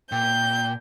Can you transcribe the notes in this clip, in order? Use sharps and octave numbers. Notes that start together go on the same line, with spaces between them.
A#2 G5 G6